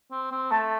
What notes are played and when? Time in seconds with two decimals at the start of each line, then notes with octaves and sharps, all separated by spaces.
0.12 C4
0.32 C4
0.51 A3 A5